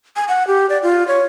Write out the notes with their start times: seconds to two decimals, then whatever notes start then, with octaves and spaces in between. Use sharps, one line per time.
0.16 G#5
0.28 F#5
0.47 G4
0.70 D5
0.83 F4
1.08 C#5